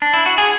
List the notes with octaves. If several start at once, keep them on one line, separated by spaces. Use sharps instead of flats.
D4
E4
F#4
G#4